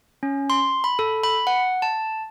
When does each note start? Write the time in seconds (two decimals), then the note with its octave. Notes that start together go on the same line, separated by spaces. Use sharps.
0.23 C#4
0.50 C6
0.84 B5
0.99 A4
1.23 B5
1.47 F#5
1.82 A5